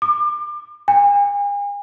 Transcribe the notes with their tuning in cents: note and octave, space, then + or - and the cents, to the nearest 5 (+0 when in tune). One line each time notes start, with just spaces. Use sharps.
D6 +30
G#5 -40